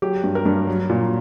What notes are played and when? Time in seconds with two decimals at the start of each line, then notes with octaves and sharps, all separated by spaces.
0.02 F#3 G4
0.24 G2
0.35 A#4
0.45 G2
0.67 F#3
0.89 A#2